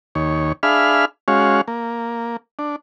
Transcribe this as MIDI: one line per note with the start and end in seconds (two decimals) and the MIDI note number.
0.15 0.53 39
0.15 0.53 73
0.63 1.05 62
0.63 1.05 68
0.63 1.05 76
0.63 1.05 77
0.63 1.05 83
0.63 1.05 89
1.28 1.61 56
1.28 1.61 61
1.28 1.61 66
1.28 1.61 73
1.28 1.61 77
1.68 2.37 58
2.59 2.76 62